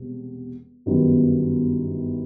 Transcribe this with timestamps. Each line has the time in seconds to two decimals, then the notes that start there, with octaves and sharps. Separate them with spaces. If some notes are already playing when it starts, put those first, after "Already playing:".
Already playing: E1 E2 C3 G3
0.86 G1 F#2 D#3 G3 B3